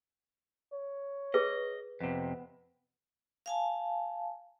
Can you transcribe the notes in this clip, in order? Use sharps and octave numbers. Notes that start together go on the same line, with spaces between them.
C#5
G#4 B4 D#5
F2 C3 B3
F5 G#5 A5